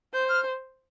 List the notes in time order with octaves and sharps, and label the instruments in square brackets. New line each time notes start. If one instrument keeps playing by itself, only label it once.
[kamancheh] C5 [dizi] G6
[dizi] F6